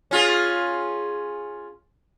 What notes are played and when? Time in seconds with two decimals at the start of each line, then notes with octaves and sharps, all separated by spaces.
0.11 C#4 F4 G#4